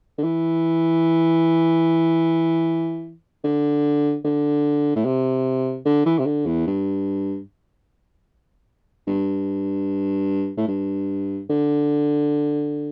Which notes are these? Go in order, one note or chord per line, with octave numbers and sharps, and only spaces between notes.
D3
E3
D3
D3
A2
C3
D3
E3
C3
D3
E2
G2
G2
A2
G2
D3